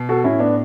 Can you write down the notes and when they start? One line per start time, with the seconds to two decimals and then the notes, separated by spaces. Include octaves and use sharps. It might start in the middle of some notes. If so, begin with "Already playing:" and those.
Already playing: B2
0.09 F#4 A4
0.24 A2 C#4 E4
0.39 B3 D4